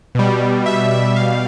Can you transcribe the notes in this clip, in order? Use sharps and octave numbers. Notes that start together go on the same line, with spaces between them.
B2 G3
B2 G3 E5
E5
B2 G3 F5